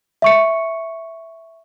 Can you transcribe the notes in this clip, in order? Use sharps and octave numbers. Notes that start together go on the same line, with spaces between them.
E5 C#6 C#7